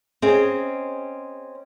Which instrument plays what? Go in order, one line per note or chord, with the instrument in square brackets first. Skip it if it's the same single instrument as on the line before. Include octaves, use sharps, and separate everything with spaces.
[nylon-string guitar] C4 C#4 G#4 D#5